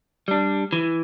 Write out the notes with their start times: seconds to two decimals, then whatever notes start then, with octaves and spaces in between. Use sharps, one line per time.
0.28 G3 D4
0.73 E3